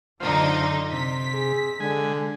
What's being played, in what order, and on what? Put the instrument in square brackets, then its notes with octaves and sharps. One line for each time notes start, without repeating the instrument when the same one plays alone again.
[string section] F#2 D3 D#4 [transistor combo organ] F4 C5
[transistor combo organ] C3 [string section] B6
[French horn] G#4
[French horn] D3 [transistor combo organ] G#3 G#5